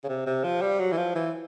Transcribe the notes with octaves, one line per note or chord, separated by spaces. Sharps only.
C#3
C3
C3
F3
G3
F#3
E3
F3
E3